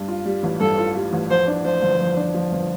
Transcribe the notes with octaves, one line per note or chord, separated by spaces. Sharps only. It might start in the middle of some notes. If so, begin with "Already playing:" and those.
Already playing: G2
F4
G3
A1
G2 A4
F4
G3
A1
F2 C5
D4
F3 C5
G1
F2
D4
F3
G1